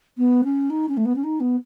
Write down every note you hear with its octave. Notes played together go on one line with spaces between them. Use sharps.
B3
C#4
D#4
C#4
A3
B3
C#4
D#4
B3